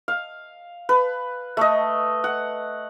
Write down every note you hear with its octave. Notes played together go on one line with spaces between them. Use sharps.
F5
B4
A3 D#5
F#5